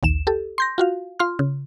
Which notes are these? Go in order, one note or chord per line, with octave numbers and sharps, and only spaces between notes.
A#1 D#2 E7
G4 A4
C6 G6 A#6
F4 F#4 F5
F4 C6 F6
C#3